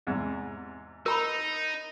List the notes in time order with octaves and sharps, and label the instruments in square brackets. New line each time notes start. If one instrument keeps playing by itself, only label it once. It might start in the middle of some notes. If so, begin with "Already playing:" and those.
[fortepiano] E2 G#2 C3
[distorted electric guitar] D#4 [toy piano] A#4 A#5 B5